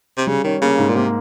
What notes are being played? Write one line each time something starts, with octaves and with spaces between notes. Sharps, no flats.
C3
C#3 G3
D#3 C#4
C#3 A#3
G#2
A#2
C3 A#3